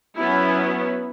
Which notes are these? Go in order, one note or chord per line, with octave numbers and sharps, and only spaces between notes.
F#3 B3 C#4 E4